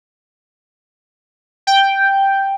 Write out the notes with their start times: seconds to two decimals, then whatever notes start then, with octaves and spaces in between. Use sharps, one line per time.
1.67 G5